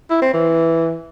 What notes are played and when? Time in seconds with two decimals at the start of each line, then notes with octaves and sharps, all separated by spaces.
0.10 E4
0.22 C4
0.33 E3